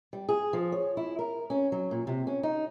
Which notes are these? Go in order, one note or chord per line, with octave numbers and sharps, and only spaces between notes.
G3
G#4
F3
C#5
E4
A#4
C#4
F#3
A#2
C3
C#4
D#4